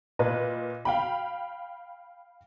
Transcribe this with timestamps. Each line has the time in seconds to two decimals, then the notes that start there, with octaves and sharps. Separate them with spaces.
0.19 A#2 B4 D#5
0.85 F5 G5 B5